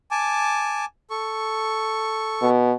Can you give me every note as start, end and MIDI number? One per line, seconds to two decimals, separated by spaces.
0.11 0.85 80
0.11 0.85 81
0.11 0.85 86
1.10 2.49 69
1.10 2.49 85
2.41 2.72 47